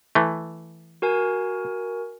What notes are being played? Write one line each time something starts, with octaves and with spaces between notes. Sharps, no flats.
E3 A3
F#4 A#4 G#5